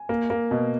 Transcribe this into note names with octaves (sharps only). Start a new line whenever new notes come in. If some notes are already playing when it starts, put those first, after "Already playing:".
Already playing: G#5
A#3
A#3
B2